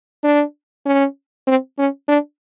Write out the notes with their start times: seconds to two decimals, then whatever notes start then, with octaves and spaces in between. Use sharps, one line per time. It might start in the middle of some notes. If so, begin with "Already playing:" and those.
0.23 D4
0.86 C#4
1.47 C4
1.78 C#4
2.08 D4